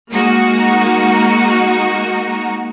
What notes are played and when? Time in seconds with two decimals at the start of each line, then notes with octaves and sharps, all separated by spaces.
0.11 G#3 A#3 D#4 F#4